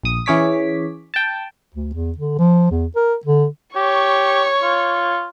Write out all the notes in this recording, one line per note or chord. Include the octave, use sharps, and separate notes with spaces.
A#1 D#6
E3 C#4 G#4 C#5 D6 B6
G5 A5
D2
E2
D3
F3
E2
A#4
D3
G4 C#5 C#6
F4